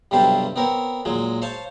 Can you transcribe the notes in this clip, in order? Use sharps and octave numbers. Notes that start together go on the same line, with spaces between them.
B1 G2 C3 G3 C5 A5
B3 C4 A#4 C#5
A#2 F#3 G#3
C5 C#5 F5 A5 C6